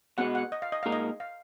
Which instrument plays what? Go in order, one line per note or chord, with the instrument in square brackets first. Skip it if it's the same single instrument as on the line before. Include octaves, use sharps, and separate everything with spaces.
[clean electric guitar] B2 G#3 B3 [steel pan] F#5
[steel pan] F#5
D#5
F5
D#5
[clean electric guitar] A#2 G#3 D#4 A#4 [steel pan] F5
[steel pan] D#5
F5